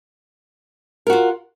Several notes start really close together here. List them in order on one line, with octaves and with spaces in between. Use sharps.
A#4 F#4 F4